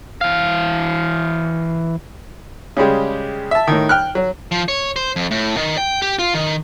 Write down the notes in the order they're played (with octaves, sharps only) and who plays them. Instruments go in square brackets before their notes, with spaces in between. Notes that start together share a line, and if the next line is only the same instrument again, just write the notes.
[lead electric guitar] E3 F5
[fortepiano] C#3 G3 G#3 G4
E5 A5
A2 D#3
G5 F6 F#6
F#3
[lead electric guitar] F3
C#5
C5
F2
A2
D#3
G5
G4
F4
D#3